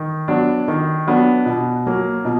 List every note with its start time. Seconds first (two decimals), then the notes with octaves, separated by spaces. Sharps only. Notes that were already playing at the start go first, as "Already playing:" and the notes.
Already playing: D#3
0.28 F#3 B3 D4
0.68 D#3
1.07 F#3 B3 D4
1.46 B2
1.87 F#3 A#3
2.25 B2